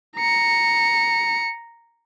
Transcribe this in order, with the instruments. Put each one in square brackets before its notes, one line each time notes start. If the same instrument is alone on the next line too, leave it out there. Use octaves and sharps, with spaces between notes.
[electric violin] A#5 C#7